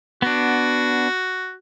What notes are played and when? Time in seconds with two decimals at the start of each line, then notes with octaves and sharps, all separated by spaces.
0.22 B3 D4 F#4